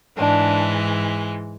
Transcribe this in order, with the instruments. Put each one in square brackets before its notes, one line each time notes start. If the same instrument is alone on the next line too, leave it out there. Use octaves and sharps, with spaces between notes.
[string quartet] G#2 E3 G#3 [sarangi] D4